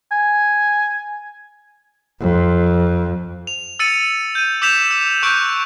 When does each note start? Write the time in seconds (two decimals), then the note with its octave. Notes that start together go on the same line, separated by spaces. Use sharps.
0.11 G#5
2.20 F2
3.47 F7
3.79 E6 A6 C#7 D#7
4.35 G6 D#7
4.62 D6 E6 G6 B6 E7 F7
4.91 E6
5.23 C#6 E6 F#6 G6 D7 F7